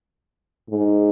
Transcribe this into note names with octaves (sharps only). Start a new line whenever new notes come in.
G#2